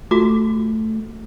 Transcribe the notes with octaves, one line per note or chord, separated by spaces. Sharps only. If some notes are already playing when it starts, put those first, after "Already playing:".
A3 F4 F#4 D6